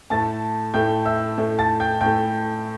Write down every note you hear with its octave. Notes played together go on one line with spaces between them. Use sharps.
A2 A3 A5 A6
A2 A3 G5 G6
E5 E6
A2 A3
A5 A6
G5 G6
A2 A3 G5 G6